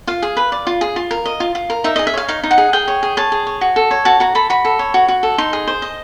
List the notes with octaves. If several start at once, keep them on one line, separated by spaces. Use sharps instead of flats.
F4 F5
G#4
B4
D5
F4
G#4
F4
A#4
D#5
F4
F4
A#4
D#4 E5
G#4 D#5
E5
C#5 F5
D#4 F5
D#4
F#5
G#4
G#4 G5
C#5
G#4
C#5 A5
G#4
C#5
F#4
A4
C#5
F#4 A5
F#4 A#5
A4 B5
F#4 B5
A4
C#5
F#4
F#4
A4
D#4 C6
G#4
C5
D#5